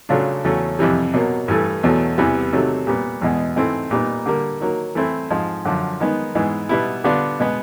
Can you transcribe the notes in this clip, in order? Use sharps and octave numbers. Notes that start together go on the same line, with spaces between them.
C#3 F#3 A3 D4 F4
E2 C#3 F#3 A3 C#4
F2 C3 E3 G3
B2 F#3 A#3
G2 E3 A3
E2 B2 F#3 A3
E2 C3 E3 G3 B3
C3 D#3 F#3 A3
A#2 G3 B3
E2 B2 G#3
G#2 E3 A3 C4
A#2 G3 B3 D#4
D3 G3 A#3
D#3 F#3 A#3
E3 A3 C4 E4
G#2 F3 G#3
F#2 D3 F3
D#3 G#3 B3 D#4
G#2 E3 G#3 B3
B2 G3 B3 E4
D3 G3 B3 D4 F4
B2 G#3 B3